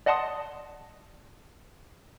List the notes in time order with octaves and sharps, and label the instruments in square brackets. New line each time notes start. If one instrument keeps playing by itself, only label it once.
[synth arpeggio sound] D5 D#5 F#5 A5 C6 D#6